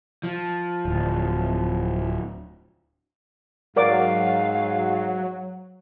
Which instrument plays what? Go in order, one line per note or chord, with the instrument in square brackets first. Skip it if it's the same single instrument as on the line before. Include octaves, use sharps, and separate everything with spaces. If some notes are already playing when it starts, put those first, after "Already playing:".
[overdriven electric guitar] F3
[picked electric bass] D1
[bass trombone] G#2 [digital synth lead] F#3 [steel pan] A#4 D5 D6 [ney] F5